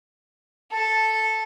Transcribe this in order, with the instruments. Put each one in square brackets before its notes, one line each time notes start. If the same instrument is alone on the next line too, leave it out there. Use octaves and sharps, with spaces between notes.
[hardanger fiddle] A4 [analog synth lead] A5